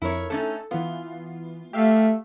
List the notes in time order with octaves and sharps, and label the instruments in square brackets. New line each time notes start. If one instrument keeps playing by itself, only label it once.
[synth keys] F2 [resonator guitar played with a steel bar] E4 A#4 C#5
[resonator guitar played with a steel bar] A3 C#4 D#4 [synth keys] A4
[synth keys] E3 B3 [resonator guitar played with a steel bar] F4
[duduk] A3 [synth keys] G4 E5 F5